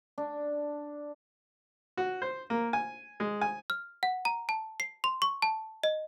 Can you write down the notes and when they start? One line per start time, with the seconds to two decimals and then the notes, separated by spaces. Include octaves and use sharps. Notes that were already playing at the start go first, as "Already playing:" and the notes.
0.18 D4
1.97 F#4
2.22 C5
2.50 A#3
2.73 G#5
3.20 G#3
3.41 G#5
3.70 F6
4.03 F#5
4.25 A#5
4.49 A5
4.80 C7
5.04 C6
5.22 C#6
5.42 A5
5.84 D#5